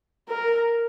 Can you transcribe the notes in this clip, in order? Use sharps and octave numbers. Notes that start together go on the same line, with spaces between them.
A#4